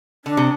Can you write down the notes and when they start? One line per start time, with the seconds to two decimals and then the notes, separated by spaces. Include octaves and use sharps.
0.25 D3 D4
0.37 C3